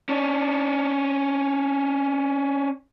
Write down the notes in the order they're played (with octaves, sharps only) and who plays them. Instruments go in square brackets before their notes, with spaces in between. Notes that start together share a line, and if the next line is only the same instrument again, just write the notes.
[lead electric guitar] C#4 D4